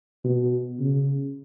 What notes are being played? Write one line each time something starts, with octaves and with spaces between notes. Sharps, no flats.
B2
C#3